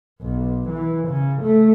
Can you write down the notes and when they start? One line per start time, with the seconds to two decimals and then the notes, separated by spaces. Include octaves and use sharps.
0.22 B1
0.69 E3
1.08 C#3
1.43 A3